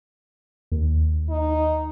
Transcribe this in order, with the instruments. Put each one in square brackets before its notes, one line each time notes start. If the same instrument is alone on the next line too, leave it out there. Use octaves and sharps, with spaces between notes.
[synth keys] D#2
[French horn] D#4